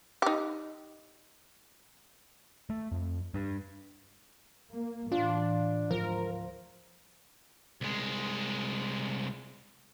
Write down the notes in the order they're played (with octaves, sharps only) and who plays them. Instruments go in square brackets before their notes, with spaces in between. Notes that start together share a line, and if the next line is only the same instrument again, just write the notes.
[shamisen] D#4 G4
[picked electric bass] A3
F2
G2
[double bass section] A#3
[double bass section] A2 E3 [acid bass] D4 [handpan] F4
[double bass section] D2 G#2 [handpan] F3 F4 [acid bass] A#4
[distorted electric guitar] C2 G#3